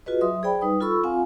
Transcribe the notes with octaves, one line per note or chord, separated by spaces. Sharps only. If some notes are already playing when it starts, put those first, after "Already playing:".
F4 F#4 G#4 B4 D#5
F#3 E5 C6 D#6
G#4 C5 D5 G5 B5
G3 D#4 B4 D#6
F4 A4 B5 C#6 E6
C4 F4 F5 F#5 G#5